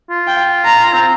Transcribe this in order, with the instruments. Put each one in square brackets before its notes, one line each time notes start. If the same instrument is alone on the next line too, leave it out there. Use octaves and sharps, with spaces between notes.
[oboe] F4
[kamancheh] G5
A#5
[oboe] C4